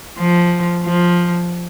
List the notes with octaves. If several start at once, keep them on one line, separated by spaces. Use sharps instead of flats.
F3
F3